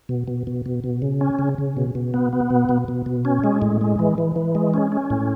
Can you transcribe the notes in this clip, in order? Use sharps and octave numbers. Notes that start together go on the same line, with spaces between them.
B2
B2
B2
B2
B2
C#3
C#4
C#3
C#3
B2
B2
B3
B3
B2
B2
B2
B2
C#4
G#3
A2
G#3
E3
E3
E3
G#3
C#4
C#4
A2